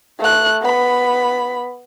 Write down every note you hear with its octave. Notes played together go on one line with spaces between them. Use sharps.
A3 F#6
B3 B5